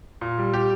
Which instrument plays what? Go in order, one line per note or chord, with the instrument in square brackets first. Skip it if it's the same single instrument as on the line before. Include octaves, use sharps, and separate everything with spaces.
[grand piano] A#2
G3
G4